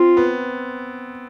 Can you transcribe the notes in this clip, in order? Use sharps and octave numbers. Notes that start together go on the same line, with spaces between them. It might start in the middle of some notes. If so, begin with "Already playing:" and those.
Already playing: C4 F4
B3